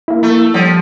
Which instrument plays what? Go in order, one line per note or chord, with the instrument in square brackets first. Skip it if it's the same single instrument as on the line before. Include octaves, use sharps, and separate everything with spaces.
[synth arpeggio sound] A#3 E4
[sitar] A3
[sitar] F3 [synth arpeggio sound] G3